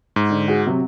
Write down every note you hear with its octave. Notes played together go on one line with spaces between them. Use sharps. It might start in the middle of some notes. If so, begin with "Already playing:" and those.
G#2
D3
F#4 G#4
C3 F#3